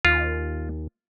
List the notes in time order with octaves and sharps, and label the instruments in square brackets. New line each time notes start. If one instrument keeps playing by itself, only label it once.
[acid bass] D#2 [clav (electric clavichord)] F4